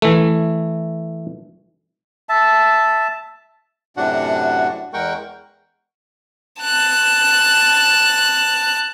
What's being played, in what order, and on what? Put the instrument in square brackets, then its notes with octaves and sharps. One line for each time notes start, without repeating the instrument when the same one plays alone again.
[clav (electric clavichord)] E3 A3
[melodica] E5 A5
[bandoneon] F#2 A2 C3 D4 F#4 F#5
E2 G#3 A#4 F#5 G5 C#6
[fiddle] A5 F#6